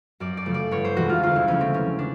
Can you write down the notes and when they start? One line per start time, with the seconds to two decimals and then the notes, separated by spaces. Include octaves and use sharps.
0.20 F#2 D5
0.37 D5
0.46 C#3 F3 A3
0.54 D5
0.71 G1 C#5
0.85 C5
0.96 F2 C3 E3 G#3 F#4
1.09 F4
1.23 D2 F4
1.36 E4
1.48 C#3 F3 A3 C#4
1.61 C4
1.74 E1 C#4
1.99 D4